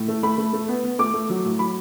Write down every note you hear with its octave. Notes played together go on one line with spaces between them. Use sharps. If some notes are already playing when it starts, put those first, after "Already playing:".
Already playing: A2
A3
A3 B5
A3
A3
B3
B3
A3 D6
A3
F#3
A2
F#3 B5